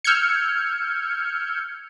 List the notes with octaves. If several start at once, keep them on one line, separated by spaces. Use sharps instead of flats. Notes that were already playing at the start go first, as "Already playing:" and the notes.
E6 F6 G6 G#6 C#7